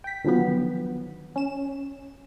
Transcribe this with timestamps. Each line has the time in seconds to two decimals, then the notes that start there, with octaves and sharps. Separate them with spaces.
0.04 G5 B6
0.24 D3 D#3 F3 F#3 B3
1.36 C#4 E7